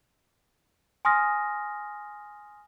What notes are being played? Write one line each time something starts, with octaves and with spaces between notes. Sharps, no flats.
G#5 C6 D#6 F6 A#6